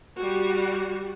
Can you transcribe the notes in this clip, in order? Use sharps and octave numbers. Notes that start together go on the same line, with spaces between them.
G3 F#4